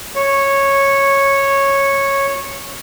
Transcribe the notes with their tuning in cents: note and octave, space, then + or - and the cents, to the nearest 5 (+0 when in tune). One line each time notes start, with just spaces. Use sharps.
C#5 -10